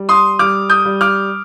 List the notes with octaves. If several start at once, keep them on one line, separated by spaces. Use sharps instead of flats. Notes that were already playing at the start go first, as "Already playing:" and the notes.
Already playing: G3
C6 D#6
G3 D6 F6
D#6 G6
G3
D6 F6